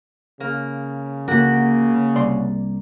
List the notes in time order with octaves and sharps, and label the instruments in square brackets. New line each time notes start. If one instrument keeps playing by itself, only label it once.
[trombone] C#3 [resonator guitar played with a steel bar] A#3
[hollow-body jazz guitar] C#2 [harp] A#3 [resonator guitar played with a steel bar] F#4 G4
[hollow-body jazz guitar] C2 D5 C6